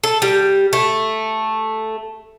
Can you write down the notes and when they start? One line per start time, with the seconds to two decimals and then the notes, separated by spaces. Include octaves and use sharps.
0.04 A4
0.22 G3
0.73 A3